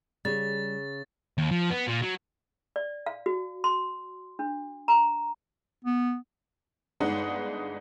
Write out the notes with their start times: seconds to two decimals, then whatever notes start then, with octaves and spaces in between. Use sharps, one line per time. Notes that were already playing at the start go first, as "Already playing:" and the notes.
0.25 C#3 G3 A6
1.38 D#2
1.51 F3
1.70 B3
1.88 A#2
2.02 F#3
2.76 D5
3.06 F5
3.26 F#4
3.64 C6
4.39 D4
4.88 A#5
5.85 B3
7.00 G1 G#3 D4 D#4 B4 F#5